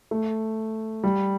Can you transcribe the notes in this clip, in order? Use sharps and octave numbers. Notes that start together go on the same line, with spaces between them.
A3
G3